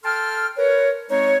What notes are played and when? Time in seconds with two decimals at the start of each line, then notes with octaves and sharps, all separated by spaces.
0.04 A4 G5 A5 C6 F6
0.57 A#4 B4 C#5
1.10 G#3 C4 D#4 C#5